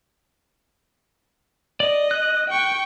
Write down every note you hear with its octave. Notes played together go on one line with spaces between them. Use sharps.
D5 D#5
F#6
G5 C#6